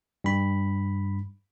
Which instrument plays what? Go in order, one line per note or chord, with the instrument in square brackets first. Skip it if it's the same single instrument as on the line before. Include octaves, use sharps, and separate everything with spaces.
[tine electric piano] G2 B5